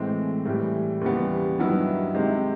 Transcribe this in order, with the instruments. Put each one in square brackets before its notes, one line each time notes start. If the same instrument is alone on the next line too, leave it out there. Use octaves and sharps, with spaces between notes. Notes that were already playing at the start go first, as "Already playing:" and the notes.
Already playing: [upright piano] A2 E3 G#3 C4
A2 E3 G3
D#2 C#3 E3 G3 B3
G2 D#3 F#3 B3 E4
C3 D#3 G#3